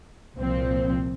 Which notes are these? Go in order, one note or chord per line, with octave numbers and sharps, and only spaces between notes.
C2 A#2 F3 C4